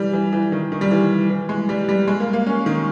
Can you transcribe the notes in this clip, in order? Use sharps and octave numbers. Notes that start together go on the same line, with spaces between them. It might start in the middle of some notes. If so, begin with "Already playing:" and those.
Already playing: E3 G3
E3
E3
D#3
D#3
G3
E3
E3
G#3
G3
G3
G#3
A#3
A#3
C#4
D#3